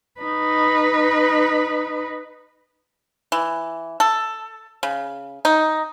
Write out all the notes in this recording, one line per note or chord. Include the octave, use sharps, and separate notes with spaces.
D#4 B4
E3
A4
C#3
D#4